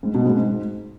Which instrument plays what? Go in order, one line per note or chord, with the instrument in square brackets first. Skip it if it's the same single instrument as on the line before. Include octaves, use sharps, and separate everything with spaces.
[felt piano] G#2
B2
G#2
G#2